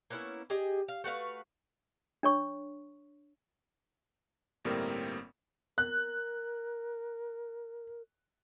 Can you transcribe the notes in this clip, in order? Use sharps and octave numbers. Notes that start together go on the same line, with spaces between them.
A#3 B3 C#4 E4
G4 G#4 D#5
F5
A3 F#4 B4 F5
D4 C#5 C#6
G1 A2 G3 A#3 C4 A#4
A#4 F#6